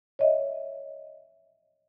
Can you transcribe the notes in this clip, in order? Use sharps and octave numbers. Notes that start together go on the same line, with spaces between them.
C#5 D#5 E5